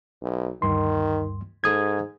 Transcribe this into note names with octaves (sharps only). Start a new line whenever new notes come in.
B1
D2 G2 D#3 C6
G#2 A4 D#6 G#6